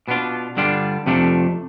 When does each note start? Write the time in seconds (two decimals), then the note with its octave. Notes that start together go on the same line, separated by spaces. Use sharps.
0.08 B2 B3 D4 F4
0.57 G2 D3 G3 D4 F4
1.06 F2 C3 F3 A3 D4